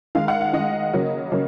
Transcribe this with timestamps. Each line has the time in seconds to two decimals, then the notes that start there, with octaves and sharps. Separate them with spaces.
0.15 D#3 G#3 F5
0.28 F#5
0.41 F5
0.53 D#3 G#3 D#5
0.93 C#3 F#3 A#3
1.32 C#3 F#3 A#3